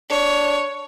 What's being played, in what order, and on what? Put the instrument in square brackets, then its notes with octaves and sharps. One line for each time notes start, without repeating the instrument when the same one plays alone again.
[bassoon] D4 [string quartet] C#5